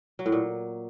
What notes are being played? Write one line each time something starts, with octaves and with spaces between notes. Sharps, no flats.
F#3
A2
A#2